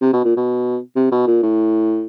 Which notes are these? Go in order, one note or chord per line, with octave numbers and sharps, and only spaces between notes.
C3
B2
A#2
B2
C3
B2
A#2
A2